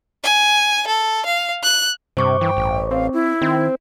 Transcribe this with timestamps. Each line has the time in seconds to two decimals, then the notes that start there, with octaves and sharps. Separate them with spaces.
0.24 G#5
0.87 A4
1.26 F5
1.63 F#6
2.17 G2 C3 C5 C#6 D6
2.41 E3 G5
2.57 A1
2.91 C4 F5
3.13 E4
3.42 D#3 C4